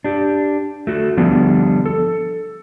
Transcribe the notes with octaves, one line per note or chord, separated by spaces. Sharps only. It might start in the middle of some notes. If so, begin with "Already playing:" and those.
D4 G4
A3 F#4
D3 F3 G3 B3 D4
A4